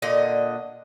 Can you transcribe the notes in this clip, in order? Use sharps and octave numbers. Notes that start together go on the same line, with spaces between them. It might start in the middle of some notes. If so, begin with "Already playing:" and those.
A#2 D3 D#5